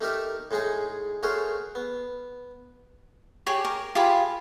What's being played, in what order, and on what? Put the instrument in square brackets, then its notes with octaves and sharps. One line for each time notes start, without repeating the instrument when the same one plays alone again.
[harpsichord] A3 D#4 G4 A#4 E5
A2 G#3 D#4 G#4 G#5
A3 F#4 G#4 A#4 C5 C#5
B3
[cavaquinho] G4 G#4 C#5
A#4
F4 G4 G#4 B5